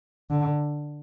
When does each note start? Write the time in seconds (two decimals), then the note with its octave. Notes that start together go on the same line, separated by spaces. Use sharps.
0.31 D3